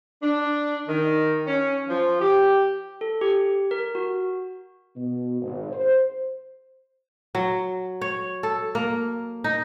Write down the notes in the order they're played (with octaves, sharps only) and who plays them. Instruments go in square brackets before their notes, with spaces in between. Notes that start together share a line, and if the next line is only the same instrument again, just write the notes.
[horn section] D4
D#3
C#4
F3
G4
[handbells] A4
G4
A#4
F#4
[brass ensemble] B2
G#1
C5
[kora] F#3
C#5
A4
A#3
D#4